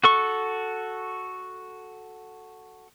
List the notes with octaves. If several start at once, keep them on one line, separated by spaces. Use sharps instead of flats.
F#4 A4 C#6